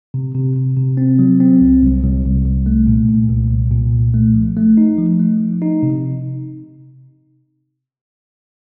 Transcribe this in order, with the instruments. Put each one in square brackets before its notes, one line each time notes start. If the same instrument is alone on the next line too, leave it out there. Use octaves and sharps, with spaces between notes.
[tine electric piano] C3
C3
C3
C3
C4
F#3
C4
C2
C2
C2
C2
C2
A3
A#2
A#2
C2
C2
A#2
C2
A3
F3
A3
D#4
F3
A3
F3
D#4
C3